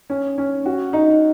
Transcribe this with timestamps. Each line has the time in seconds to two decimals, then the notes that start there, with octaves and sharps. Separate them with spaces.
0.10 C#4
0.38 C#4
0.66 F#4
0.93 D#4